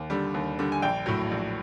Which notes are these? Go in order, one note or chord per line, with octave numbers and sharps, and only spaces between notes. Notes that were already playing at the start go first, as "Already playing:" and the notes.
Already playing: D#2
D3 G3
D#2
D3 G3
G#5
A#1 G5
A2 F#3
A#1